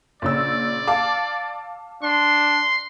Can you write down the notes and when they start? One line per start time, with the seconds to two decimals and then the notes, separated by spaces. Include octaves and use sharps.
0.22 A#1 C#3 D5 E6
0.88 F5 A5 D6
2.03 D4 C6